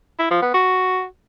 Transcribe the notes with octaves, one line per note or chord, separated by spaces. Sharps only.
E4
F3
B3
F#4